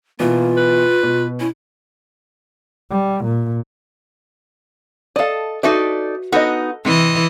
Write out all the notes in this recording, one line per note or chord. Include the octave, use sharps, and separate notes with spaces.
B2 E3 A#3 F4
B4
B2
C#4 E4
G3
A#2
A4 D5 D#5 F5
D#4 F#4 A4 B4 D5 E5
B3 D#4 F#4 A4 D#5
C3 E3 C4 D#5